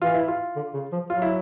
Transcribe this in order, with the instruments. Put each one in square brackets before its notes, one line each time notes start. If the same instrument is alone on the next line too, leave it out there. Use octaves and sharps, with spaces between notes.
[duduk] E3 [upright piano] F4
[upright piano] E4
F4
[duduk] D3
C#3
F3
[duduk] F#3 [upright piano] F4
[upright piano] E4